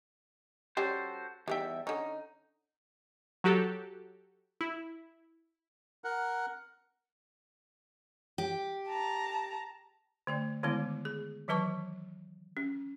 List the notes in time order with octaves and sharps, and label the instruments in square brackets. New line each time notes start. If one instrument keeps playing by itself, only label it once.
[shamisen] G3 C#4 G4 [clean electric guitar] F#4 A4 C5
[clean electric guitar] E2 E5 [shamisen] G3 D#4 G5
[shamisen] D3 C#4 [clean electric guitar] D#4
[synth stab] F#3 F#4 G4 A4
E4
[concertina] A#4 F#5
[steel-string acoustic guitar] G4
[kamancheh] A5 A#5
[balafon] D3 A3 D5
D3 D#3 G#3 B3 E4
G#4
D#3 E3 F#3 B4 A5 C#6
C#4